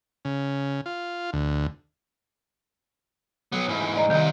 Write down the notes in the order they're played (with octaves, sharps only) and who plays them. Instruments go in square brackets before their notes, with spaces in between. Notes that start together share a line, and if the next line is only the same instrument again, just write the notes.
[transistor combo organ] C#3
F4
D2
[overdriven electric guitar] F#3 B3
G#2 E3
[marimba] D5 D#5 A#5
[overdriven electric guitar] C2 C3 [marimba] D#3